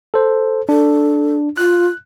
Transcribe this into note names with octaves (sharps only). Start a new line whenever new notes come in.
A4 C5
D4 A4
F4 F#6